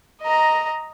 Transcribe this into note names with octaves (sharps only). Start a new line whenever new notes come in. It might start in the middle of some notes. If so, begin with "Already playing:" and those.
D#5 A#5